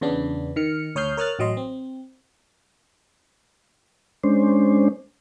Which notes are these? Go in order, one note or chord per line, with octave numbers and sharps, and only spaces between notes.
E2 C#3 B3 D4
D#3 F6 C#7
D2 C#5 D#6 F6 G6 C7
A#4 C#5 D#6 F6 F#6 A6
A1 F#3 D#5 C6
C4
G#3 C#4 D4 C5